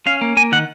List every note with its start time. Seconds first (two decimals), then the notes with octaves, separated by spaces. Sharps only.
0.06 C#4 F5
0.21 A#3
0.37 A#3 G#5
0.52 D#3 F#5